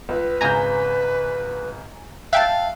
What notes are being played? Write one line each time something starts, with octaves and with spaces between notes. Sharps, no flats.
C#2 B4
G#1 C#3 G#5 A#5 G6
E5 F5 G5 A5 F#6